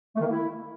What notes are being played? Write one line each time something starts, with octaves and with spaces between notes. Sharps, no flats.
A3
D#3
A#3
E4